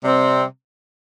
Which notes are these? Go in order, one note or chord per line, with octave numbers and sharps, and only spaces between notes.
C3 G3 C4